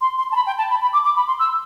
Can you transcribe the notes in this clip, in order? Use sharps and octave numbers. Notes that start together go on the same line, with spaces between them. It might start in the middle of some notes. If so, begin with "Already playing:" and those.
C6
C6
A5
B5
G5
A5
B5
B5
D6
D6
B5
C6
E6